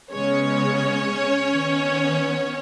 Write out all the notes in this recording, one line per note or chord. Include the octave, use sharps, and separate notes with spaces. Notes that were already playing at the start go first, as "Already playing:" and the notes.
C#3 G#3 B3 C#4 C#5
D#3 B3